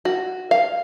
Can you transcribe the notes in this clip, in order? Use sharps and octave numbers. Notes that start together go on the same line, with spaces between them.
F#4
F5